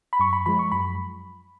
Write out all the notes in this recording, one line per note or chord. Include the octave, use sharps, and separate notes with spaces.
B5
F#2 C#6
B5
F3 G#3 B5
C#6
F#2 B5